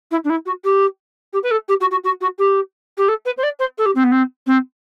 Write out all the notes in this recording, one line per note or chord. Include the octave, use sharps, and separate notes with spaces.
E4
D4
E4
F#4
G4
G4
B4
A4
G4
F#4
F#4
F#4
F#4
G4
G4
A4
B4
C5
D5
C5
A4
G4
C4
B3
C4
C4